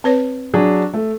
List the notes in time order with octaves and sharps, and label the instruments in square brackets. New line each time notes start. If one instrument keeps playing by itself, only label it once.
[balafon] C4 B4 C#5
[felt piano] F#3 D4 G#4
A3